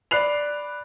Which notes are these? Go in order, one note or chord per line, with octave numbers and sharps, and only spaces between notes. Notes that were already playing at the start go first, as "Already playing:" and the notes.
D5 B5 F#6 C7 F7